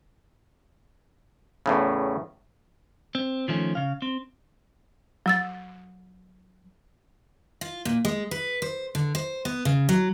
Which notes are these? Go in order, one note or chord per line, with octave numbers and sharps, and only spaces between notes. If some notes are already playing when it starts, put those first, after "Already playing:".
E2 A2 C#3
C4
D#3 F3 A3 C#4
C#3 F5
C4
F#3 E6 A6
F4
A#2
G#3
B4
C5
D3
C5
B3
C#3
F#3